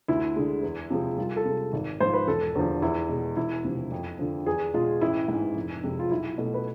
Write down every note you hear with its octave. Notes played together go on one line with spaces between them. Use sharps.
D2 E4
D3 G#3
E2
C3 F3 G#3
C2 F4
A4
C3 G#3
G#1
G#2 F3 C5
B4
E1 A4
E2 D3 F3
E2 E4
B2 G#3
E1 E4
D2 C3 F3
F2
D3 F3
E2 G#4
B2 G#3 F4
A1 E4
G#2 E3
F1
F2 C3 G#3
F4
B1 E4
B2 A3
B4